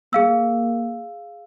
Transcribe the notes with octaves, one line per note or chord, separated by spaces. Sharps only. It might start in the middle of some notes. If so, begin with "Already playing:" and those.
A#3 G#4 F5 E6